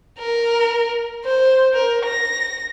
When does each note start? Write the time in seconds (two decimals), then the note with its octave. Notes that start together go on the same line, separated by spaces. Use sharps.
0.19 A#4
1.25 C5
1.74 A#4
2.06 A#6